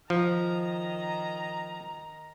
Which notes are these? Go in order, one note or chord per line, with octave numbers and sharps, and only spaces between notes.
D#3 F3 A#5